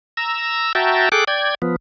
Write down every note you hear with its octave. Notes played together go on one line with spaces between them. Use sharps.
A#5 E6
F#4 E5 G5 A5 A#5
G#4 A4 G5 D6 F#6
D5 G5 G#6
F3 B3